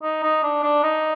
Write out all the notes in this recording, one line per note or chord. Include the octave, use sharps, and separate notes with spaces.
D#4
D#4
D4
D4
D#4